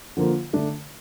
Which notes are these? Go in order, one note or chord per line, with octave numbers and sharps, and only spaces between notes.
D3 F3 A#3 F4
D3 A3 D4